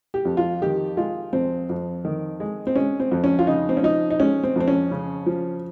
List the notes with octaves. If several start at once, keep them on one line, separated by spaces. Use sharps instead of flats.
G4
F2
F4
D#3 G4
G#3 F4
F2 C4
F2
D#3
G#3
C4
G#3 C#4
C4
F2
C#4
F4
C#3 D#4
C4
C#4
F3 D#4
D#4
G#3 C#4
C4
F2 C4
C#4
C#3
F3